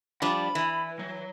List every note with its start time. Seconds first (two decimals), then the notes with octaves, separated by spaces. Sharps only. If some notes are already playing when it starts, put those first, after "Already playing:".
0.22 F3 G3 D4 B5
0.55 E3
0.99 F#3